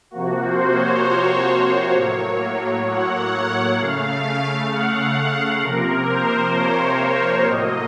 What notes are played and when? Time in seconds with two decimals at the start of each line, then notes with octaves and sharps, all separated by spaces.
0.11 C3 F3 A#3 F#4
0.42 C5
0.72 C#5
1.95 A2 F#3 A#3
2.86 F#5
3.78 C#3 A3 F5
4.71 F#5
5.62 C3 F3 A#3 A#4
6.08 C5
6.54 C#5
7.46 A2 F#3 A#3 D#5